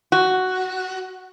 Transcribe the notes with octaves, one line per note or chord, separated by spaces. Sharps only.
F#4